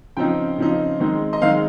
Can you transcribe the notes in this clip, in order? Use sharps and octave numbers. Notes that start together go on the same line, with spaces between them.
C#3 F3 C4 D#4 G5
C#3 F3 C4 D#4
D#3 G#3 C4 D#4
D#5
D#3 G#3 C4 D#4 F5